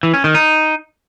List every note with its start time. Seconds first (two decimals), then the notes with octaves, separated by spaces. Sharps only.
0.03 E3
0.14 C#4
0.24 D#3
0.35 D#4